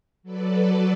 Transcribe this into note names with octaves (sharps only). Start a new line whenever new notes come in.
F#3 A4 B4 D5